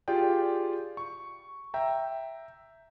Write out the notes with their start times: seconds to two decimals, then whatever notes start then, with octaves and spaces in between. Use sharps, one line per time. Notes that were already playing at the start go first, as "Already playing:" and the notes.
0.08 F4 G4 G#4 D5 G5
0.97 C#6
1.74 E5 G5 A#5